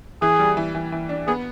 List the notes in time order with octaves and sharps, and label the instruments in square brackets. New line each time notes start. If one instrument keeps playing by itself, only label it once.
[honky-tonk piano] E3 [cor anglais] G#4
[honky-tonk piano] G3
E3
E3
E3
D4
[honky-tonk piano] B3 [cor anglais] G#4